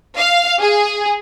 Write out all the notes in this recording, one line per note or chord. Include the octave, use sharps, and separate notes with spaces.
F5
G#4